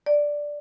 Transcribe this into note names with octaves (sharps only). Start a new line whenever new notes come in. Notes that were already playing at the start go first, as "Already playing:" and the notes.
D5